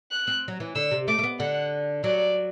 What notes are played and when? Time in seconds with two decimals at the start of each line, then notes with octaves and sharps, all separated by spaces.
0.12 F#6
0.27 C4
0.48 F#3
0.60 E3
0.75 D3 E6
0.91 C3
1.08 A3 D6
1.19 A3
1.24 B3
1.39 D3 F#5
2.04 F#3 D5